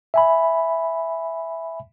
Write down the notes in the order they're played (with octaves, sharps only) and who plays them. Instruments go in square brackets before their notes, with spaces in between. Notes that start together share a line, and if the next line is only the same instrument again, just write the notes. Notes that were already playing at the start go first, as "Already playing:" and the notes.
[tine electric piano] E5 G#5 B5